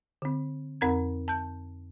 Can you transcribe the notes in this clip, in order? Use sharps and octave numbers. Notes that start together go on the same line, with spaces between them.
D3 C4
F2 C4 A#4 A#5 G#6
A5 G6